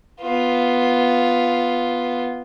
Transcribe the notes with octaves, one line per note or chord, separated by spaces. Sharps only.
B3 F4